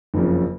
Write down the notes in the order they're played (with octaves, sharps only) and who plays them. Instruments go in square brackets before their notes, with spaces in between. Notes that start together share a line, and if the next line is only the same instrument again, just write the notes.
[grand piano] F#1 F2 C#3 F3